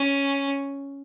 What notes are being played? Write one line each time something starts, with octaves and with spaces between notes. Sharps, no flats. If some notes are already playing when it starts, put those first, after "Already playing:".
Already playing: C#4